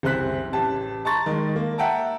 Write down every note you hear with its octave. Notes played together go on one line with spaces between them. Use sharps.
F#1 C2 C5 F#6 B6
A1 G4 A5
A5 A#5 C6 C#6 A6
D#3 G#3
A#3
E5 F#5 G5 A5 A#5